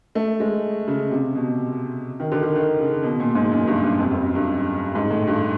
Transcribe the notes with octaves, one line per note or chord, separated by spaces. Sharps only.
A3
G#3
C#3
C3
B2
D#3
D3
D#3
D#3
C#3
B2
A#2
G#2
F#2
G2
G2
F2
F2
F#2
G2
G#2
A2
G2